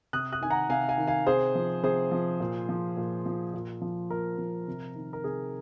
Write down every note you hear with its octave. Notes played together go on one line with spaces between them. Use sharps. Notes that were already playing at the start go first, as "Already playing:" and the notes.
C3 D#6 F#6
D#6 F#6
D#3 G#5
F#5 A#5
C3 F5 G#5
F5 G#5
D#3
F5 G#5
C3 G#4 C5
F3
C3 G#4 C5
F3
A#2
F3
A#2
F3
A#2
F3
A#2 A#4
F3
C3
D#3
A#4
C3 G#4